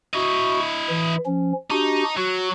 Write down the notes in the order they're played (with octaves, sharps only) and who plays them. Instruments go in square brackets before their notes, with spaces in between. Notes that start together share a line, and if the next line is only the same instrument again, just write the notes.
[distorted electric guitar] E4 D#5 [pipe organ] F#4 C#6
[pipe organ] E3
F3 C#4
[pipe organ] D4 F#4 G4 [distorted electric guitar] D#4
[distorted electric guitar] F#3 [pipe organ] F#4